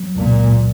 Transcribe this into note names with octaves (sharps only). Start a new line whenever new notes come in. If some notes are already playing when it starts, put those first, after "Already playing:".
Already playing: F#3
C#2 A#2